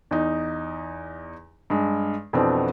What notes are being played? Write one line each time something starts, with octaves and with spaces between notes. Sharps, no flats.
E2 D#4
G2 G#3
F2 B2 E3 B3 C4 D4